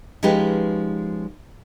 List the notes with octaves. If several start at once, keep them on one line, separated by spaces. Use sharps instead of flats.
F3 G#3 C#4 D#4 G4 B4